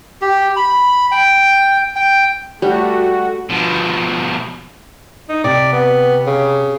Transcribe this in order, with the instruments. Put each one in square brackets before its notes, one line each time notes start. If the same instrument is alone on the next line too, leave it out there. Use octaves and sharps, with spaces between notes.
[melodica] G4
B5
G5
G5
[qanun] G3 [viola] A3 [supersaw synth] F#4
[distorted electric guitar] B2 F3
[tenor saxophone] D#4
[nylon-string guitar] C3 [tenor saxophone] D5
[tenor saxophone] B3
C#3